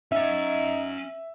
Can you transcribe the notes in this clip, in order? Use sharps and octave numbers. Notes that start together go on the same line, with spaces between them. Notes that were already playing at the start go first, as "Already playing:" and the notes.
C#4 D#4 E5 F#5